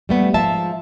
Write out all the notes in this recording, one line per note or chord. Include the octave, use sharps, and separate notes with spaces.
G3 A3 B3
G#2 F3 F4 E5 A5